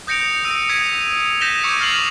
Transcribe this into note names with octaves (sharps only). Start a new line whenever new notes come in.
D#6 G6 A#6 C#7 D7 F7
E6 A#6 D#7
D#6 G#6 B6 D#7 F7
G6 A#6 B6 E7 F7 G7
C#6 D6 E6 G#6 C#7
F6 A6 C7 F7 F#7